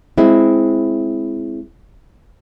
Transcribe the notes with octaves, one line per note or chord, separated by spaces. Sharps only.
G#3 C4 E4